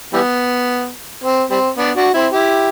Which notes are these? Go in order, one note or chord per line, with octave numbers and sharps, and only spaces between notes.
E3 G3 B3
C4
G3 C4
B3 D4
D4 F#4
C4 E4
E4 G4